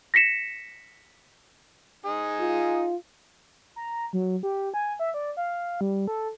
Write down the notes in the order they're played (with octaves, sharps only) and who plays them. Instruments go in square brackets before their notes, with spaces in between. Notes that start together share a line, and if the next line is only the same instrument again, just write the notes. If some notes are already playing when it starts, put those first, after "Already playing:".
[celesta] A#6 B6 C#7 E7
[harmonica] D#4 G#4
[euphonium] F4
[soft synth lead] A#5
F#3
G4
G#5
E5
D5
F5
G3
A4